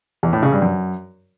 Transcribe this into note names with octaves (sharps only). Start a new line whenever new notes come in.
E2
A2
C#3
G2
F#2